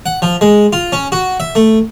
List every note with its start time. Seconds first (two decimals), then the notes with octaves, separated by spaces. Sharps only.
0.06 F#5
0.22 F3
0.41 G#3
0.73 F4
0.92 C#4
1.12 F#4
1.40 E5
1.55 A3